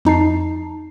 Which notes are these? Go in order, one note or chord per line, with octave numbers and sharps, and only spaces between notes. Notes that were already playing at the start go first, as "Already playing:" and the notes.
F2 D#4 A5 C7